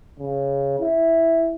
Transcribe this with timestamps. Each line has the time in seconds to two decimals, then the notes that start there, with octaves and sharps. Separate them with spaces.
0.19 C#3
0.80 E4